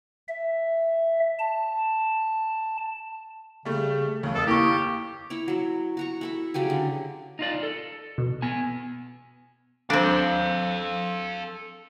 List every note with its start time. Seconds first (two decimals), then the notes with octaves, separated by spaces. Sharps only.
0.28 E5
1.39 A5
3.65 C#3 G3 A3
4.07 A3
4.23 D#2 C#3 A3
4.35 F2 A4 A#4 D#6
4.47 A#3 E4 G4 C#6
5.30 E4 A#4 C#5
5.48 F#3 E4
5.97 F#4 A#5 C#6
6.21 E4 A4 E5
6.54 C#3 F#3 G4 G#5
6.70 D3
7.39 D#4 F4 D5
7.63 A4
8.18 B2
8.42 B3 G#5
9.90 C4 D4 A4 F5